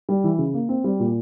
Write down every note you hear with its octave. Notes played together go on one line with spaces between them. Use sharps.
G3
E3
C#3
A#3
C4
G3
A#2